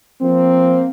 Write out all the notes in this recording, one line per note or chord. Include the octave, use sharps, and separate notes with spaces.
F3 A#3 C4